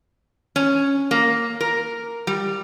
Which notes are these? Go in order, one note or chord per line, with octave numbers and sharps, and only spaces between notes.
C#4
A#3
A#4
G3